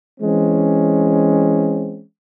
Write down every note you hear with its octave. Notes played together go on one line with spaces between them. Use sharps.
E3 G#3 C4 C#4